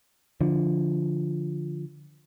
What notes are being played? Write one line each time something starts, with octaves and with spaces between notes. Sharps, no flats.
D3 F3